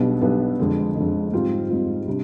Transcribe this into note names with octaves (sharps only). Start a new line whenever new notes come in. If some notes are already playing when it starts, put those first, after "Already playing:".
Already playing: B1 B2 G3 B3 D4
B1 B2 G3 B3 D4
F2 D3 G#3
F2 D3 G#3
G#2 G3 C4 F4
G#2 G3 C4 F4
C3 G3 D4